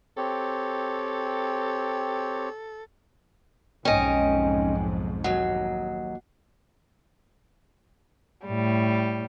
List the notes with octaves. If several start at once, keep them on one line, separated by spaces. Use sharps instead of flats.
C4 G4 A4 C#5
B1 F2 G#2 C#4 D#5 G5 G#5
D#2 F#3 F#5
A2 G3